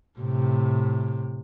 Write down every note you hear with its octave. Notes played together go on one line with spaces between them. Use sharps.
A2 C3